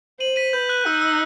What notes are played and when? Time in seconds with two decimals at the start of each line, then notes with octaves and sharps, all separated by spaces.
0.20 C5 D#7 F#7
0.36 B6 D#7
0.53 B4 G6
0.69 F#6
0.81 F#6
0.86 D#4 E6
0.99 F#6
1.02 E6